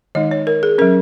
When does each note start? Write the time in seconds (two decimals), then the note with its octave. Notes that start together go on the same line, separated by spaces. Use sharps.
0.15 D#3 G#3 D#4 D#5
0.31 C#5
0.47 A#4
0.63 G#4
0.78 F#3 C#4 A#4